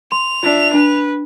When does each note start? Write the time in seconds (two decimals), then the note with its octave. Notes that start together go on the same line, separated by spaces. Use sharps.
0.12 C6 F7
0.43 D4 F4 D5 E5
0.74 D4 B4